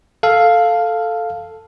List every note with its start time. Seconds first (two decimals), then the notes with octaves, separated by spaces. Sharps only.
0.23 A4 F5